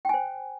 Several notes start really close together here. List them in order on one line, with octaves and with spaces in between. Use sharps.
G5 G#5 C5